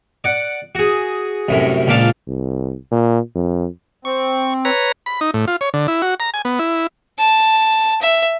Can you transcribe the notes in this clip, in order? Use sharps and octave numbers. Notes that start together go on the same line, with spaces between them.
D5 F#5
F#4 G#4
C2 F#2 A2
C#2 A#2 F3 D4 F5 A5
C2
A#2
F2
C4 C#6
B4 C#5 A#5
B5
D#4
A2
F4
C#5
D3
E4
F#4
A#5
G#5
B3
E4
A5
E5